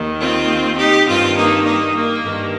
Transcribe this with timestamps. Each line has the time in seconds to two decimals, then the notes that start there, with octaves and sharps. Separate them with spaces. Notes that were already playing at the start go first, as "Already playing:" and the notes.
Already playing: D#2 D#3
0.19 C4 F4
0.77 D#4 G4
1.06 G2 D#3 C4 F4
1.35 A#3 D#4
1.63 A#3 D#4
1.93 A#3
2.21 G2 D#3